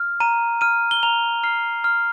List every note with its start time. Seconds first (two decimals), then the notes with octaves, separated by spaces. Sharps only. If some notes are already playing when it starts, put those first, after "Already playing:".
Already playing: F6
0.20 A#5 D#7
0.61 F6 D#7
0.91 G7
1.03 A#5 F7
1.43 F6 C7
1.84 F6